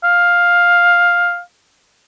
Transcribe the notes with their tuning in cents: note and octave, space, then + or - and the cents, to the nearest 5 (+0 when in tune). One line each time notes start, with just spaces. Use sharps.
F5 +5